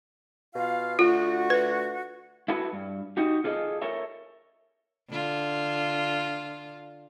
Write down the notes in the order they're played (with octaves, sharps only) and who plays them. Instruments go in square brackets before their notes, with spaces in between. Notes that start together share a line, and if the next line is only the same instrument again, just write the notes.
[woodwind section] B2 F4 F5
[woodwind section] D3 A3 F#4 [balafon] F4
[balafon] B4
[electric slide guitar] E4 F#4 A4 B4
G2
D#4 F#4 G4
F4 G#4 A4 D5 D#5
A4 A#4 C#5 E5
[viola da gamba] D3 F4